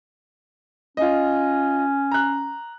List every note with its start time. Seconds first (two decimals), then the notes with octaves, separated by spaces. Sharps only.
0.97 C#4 F4 D#5
2.12 A#5 F#6